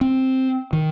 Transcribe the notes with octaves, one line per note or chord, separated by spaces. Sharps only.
C4
D#3